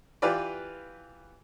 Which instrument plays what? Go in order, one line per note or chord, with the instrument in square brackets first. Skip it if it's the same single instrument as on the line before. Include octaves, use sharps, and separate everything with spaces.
[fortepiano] E3 F4 G4 B4 D5